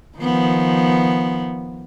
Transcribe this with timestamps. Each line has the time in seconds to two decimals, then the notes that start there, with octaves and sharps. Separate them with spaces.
0.18 D#3 F3 B3